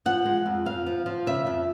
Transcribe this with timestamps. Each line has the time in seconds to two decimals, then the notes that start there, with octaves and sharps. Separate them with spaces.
0.06 F3 F#5
0.25 G#3
0.46 F2
0.65 F2 F5
0.86 F3
1.06 F3
1.27 C#3 E5
1.47 F2